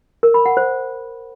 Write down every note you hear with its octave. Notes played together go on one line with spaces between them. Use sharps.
A#4
B5
F#5
C5